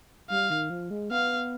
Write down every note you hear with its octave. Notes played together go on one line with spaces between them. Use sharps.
G3 F5
D#3
F3
G#3
B3 F5